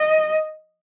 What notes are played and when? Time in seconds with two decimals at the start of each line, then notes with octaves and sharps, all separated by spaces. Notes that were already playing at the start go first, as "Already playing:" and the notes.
Already playing: D#5